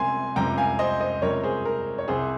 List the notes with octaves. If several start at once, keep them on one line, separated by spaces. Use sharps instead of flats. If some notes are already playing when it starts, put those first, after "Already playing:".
Already playing: C#2 C3 G3 G#5 C6
C#2 C3 G3 G5 A#5
F5 G#5
C5 D#5
C5 D#5
C#2 C3 G3 A#4 C#5
G#4 C5
A#4
C#5
C2 C3 G3 G#4 C5